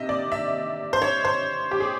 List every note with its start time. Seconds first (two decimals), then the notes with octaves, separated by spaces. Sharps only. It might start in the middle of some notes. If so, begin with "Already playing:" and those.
Already playing: C3 D#3 D#5 E5
0.09 D5
0.32 E5
0.93 C5
1.02 C#5
1.25 C5
1.71 G4
1.80 G#4